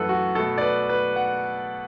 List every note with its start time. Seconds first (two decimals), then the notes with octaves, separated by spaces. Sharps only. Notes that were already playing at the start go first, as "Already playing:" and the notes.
Already playing: F#2 E3 A3 A4 B4 F#5
0.09 F#4
0.35 B2 A3 A4
0.58 D5
0.61 B4
0.89 B4
1.16 F#5